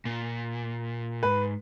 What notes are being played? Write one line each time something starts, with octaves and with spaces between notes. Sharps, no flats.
A#2
G#2 B4